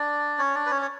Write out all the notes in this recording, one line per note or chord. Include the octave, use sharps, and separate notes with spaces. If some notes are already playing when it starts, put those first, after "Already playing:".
Already playing: D4 D5
C#4 C#5
D4 D5
B4
C#4 C#5
C#5